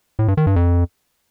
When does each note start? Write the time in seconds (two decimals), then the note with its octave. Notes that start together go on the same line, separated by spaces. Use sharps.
0.19 A2
0.28 G2
0.37 D#3
0.47 G2
0.56 F2